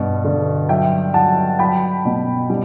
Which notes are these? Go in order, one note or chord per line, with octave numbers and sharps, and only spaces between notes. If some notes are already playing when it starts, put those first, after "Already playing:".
Already playing: G2 B2
D3
F#3 E5 G5
F#3 F#5 A5
F#3 G5 B5
B2
G3